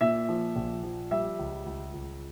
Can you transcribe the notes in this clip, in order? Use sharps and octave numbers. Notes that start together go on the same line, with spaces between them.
A#2 E5
F3
A#1
F3
G3 E5
C#2
C#2
C#2